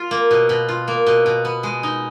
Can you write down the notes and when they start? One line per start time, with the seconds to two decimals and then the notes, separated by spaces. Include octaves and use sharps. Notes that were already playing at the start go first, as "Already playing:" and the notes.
Already playing: F4
0.11 A#3
0.31 B2
0.49 B2
0.68 F4
0.88 A#3
1.07 B2
1.26 B2
1.45 B3
1.63 G#3
1.83 D#4